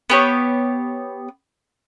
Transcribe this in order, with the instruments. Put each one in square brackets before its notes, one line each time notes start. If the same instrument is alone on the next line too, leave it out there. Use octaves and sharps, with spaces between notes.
[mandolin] B3 G4 C#5